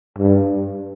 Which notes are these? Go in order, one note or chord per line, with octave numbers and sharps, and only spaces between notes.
G2